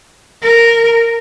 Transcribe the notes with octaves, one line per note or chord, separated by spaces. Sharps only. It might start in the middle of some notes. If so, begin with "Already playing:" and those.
A#4